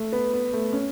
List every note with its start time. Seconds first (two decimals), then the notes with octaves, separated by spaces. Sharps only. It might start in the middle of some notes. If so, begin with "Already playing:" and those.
Already playing: A3
0.12 B3
0.33 B3
0.53 A3
0.73 C#4